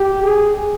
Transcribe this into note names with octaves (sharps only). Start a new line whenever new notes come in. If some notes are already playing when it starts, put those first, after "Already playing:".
Already playing: G4
G#4